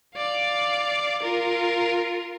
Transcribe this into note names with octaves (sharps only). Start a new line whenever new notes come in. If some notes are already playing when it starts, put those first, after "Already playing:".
D5 F5
F4 A#4